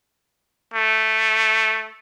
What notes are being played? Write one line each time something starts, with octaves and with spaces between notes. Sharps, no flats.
A3